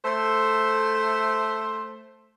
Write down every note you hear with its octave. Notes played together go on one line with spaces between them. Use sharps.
A3 C5